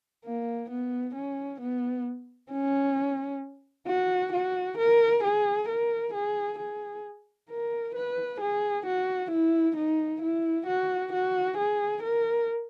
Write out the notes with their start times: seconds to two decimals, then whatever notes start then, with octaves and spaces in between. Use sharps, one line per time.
0.25 A#3
0.70 B3
1.15 C#4
1.61 B3
2.51 C#4
3.87 F#4
4.33 F#4
4.78 A#4
5.23 G#4
5.69 A#4
6.14 G#4
6.59 G#4
7.50 A#4
7.95 B4
8.41 G#4
8.86 F#4
9.31 E4
9.76 D#4
10.22 E4
10.67 F#4
11.13 F#4
11.58 G#4
12.03 A#4